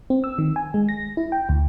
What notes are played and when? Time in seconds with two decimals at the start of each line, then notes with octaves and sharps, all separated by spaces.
0.10 C4
0.24 E6
0.38 D#3
0.56 G#5
0.74 G#3
0.89 A#6
1.17 E4
1.32 G5
1.49 D2